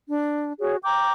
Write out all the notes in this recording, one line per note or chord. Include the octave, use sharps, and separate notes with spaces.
D4
F#4 G#4 C#5
G5 A#5 D6 G6